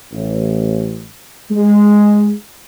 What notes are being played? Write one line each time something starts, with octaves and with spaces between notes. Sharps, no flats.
A1
G#3